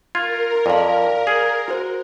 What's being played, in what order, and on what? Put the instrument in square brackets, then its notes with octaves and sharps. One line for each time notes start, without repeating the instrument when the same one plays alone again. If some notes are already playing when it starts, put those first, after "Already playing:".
[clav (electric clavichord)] F4 [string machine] A#4 [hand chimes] G#6
[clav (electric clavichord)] F2 [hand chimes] D5 F5
[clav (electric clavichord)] G#4
[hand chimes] F#4 C5